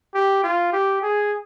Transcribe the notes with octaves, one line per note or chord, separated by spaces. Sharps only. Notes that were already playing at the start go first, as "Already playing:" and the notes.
G4
F4
G4
G#4